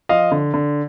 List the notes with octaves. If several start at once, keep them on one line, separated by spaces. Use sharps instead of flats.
F3 D#5 F5
D3
D3